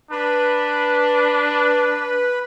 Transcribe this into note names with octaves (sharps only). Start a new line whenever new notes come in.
D4 B4